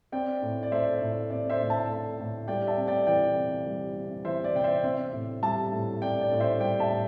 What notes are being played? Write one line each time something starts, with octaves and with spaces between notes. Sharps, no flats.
C4 D5 G5
A2
D5
A3 C5 E5
A2
C4 D5
C5 E5
A2
E5 A5
A3
A2
G3 D5 G5
E5 A5
C4
D5 G5
E3 D5 G5
C3
G3
C4
E3 C5 E5
D5
C3 G5
C5 E5
C4 C5 E5
A2
G3 E5 A5
A2
C4 D5 G5
D5
A2
C5 E5
G3 D5 G5
E5 A5
A2